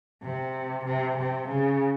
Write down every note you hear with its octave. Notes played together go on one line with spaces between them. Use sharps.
C3
C3
C3
C#3